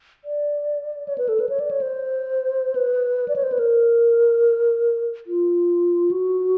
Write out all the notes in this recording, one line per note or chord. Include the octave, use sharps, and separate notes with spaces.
D5
C#5
B4
A4
B4
C#5
D5
C#5
C5
B4
D5
C#5
C5
B4
A#4
F4
F#4